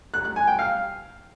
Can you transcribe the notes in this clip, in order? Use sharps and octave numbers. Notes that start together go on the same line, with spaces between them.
F#6
F#6
G#5
G5
F5